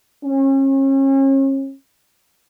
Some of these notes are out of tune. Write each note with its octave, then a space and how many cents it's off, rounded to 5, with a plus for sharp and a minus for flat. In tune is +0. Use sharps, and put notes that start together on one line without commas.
C#4 -35